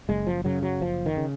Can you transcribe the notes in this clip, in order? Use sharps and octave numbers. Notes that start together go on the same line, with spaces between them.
F#1 G#3
F3
F#2 C#3 F#3
F#3
F#1 F3
D#3
C#3